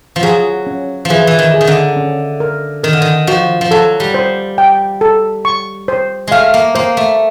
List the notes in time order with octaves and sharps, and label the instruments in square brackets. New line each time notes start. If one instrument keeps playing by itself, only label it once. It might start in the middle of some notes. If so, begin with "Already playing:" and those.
[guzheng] F3
[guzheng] F#3 [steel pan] G#4
[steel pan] C#4
[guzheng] F3
[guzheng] E3 [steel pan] G#4
[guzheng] E3
D#3
[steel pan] G#4
[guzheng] D#3
D3
[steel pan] C#4
A#4
[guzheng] D#3 [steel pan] A#4
[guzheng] D3
D#3
[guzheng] F3 [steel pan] F#4
[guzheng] F3
[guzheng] F#3 [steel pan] A4
[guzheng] G3
[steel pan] C5
G5
A4
C#6
C5
[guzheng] G#3 A3 [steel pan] F5
[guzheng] A#3
[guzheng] A#3 [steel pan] C5
[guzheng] A3